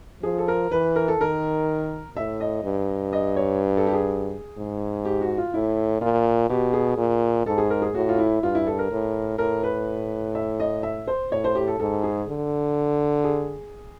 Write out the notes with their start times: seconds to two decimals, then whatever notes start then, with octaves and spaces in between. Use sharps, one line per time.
0.23 F3 G#4
0.38 A4
0.48 A#4
0.71 E3 B4
0.96 A#4
1.08 A4
1.20 D#3 A#4
2.16 A2 E5
2.40 D#5
2.64 G2
3.13 D#5
3.36 C#5
3.77 A4
3.87 G4
3.93 G#4
4.58 G#2
5.05 G4
5.21 F#4
5.38 F4
5.54 A2 E4
6.01 A#2 F4
6.50 B2 G4
6.73 G#4
6.98 A#2
7.46 G#2 A4
7.58 G#4
7.70 A#4
7.82 G#4
7.95 A2 F#4
8.09 F4
8.18 E4
8.43 G2 F4
8.55 E4
8.67 A4
8.79 A#4
8.91 A2
9.38 A2 A#4
9.63 B4
10.35 E5
10.60 D#5
10.83 E5
11.07 C5
11.32 A2 C#5
11.44 C5
11.55 G4
11.67 A4
11.80 G#2 A4
12.04 G#4
12.28 D3
13.24 G#4